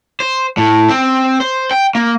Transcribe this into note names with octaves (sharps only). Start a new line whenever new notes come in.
C5
A2
C4
C5
G5
A#3